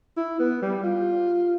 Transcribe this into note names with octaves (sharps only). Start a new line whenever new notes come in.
E4
B3
G3
F4